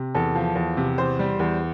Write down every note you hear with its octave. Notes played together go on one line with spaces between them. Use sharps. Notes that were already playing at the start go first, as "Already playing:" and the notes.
Already playing: C3
E2 A4
F3
E2
C3
E2 C5
G3
E2